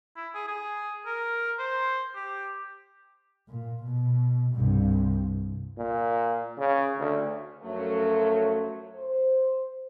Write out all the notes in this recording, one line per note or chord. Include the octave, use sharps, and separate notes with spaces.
E4
G#4
G#4
A#4
C5
G4
A#2
B2
C2 G2
A#2
C#3
D2
F#2 F3 F#3 A3
C5